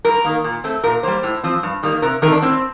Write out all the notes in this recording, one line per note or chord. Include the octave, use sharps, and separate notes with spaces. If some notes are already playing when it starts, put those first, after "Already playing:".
G2 A#4
D#3 A#3
A#2
A3 C4
A#2 A#4
G3 A#3 C5
A2
F3 C4
G2
D#3 G3 A#3
C3 A#4
D#3 A3 C4 A#4
D4
A2 C4